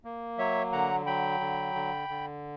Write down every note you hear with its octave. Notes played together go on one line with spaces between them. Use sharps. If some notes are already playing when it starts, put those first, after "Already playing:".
A#3
F#3 C#5 E5
D3 F#5 A#5
F#3 G5 B5
D3
D3
D3